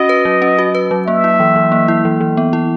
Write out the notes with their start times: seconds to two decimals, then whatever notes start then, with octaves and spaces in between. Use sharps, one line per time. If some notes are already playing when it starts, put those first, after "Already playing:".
Already playing: C#4 F#4 D#5
0.09 B4
0.25 F#3
0.42 C#4
0.59 F#4
0.75 B4
0.91 F#3
1.07 A#3 E5
1.24 E4
1.40 E3
1.56 E3
1.72 A#3
1.88 E4
2.05 E3
2.21 E3
2.37 B3
2.53 E4